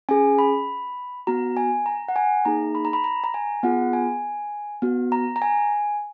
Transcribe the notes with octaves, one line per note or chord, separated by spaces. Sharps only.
C#4 G#4 G#5
B5
B3 F#4 A#5
G#5
A#5
F#5
G#5
A#3 D#4 G#4 A#5
B5
A#5
B5
A#5
A#5
G#5
B3 F4 G#4 F#5
G#5
B3 F#4
A#5
A#5
G#5